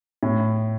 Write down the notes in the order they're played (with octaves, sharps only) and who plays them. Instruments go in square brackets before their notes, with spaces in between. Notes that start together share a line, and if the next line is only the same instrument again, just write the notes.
[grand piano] A2